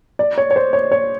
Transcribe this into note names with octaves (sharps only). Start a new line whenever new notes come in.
D5
C#5
C#5
C5
C#5
C#5